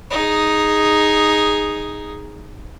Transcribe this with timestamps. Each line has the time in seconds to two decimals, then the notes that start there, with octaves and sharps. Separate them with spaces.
0.11 D#4 G#4